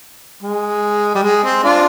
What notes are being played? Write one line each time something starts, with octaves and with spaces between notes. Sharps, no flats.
G#3
G3
G#3
C4
D4 F4